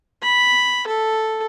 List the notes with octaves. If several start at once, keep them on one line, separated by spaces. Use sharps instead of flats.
B5
A4